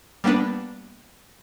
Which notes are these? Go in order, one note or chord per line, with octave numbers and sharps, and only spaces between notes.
G3 A#3 B3 D4 B4